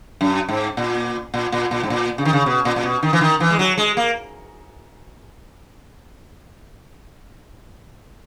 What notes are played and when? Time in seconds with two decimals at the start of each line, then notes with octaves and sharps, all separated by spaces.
0.21 F#2
0.49 G#2
0.77 A#2
1.34 A#2
1.52 A#2
1.71 A#2
1.83 G#2
1.90 A#2
2.18 C#3
2.25 D#3
2.33 C#3
2.46 B2
2.65 A#2
2.76 A#2
2.83 B2
3.03 D#3
3.13 E3
3.21 D#3
3.40 E3
3.50 G#3
3.59 F#3
3.78 G#3
3.97 A#3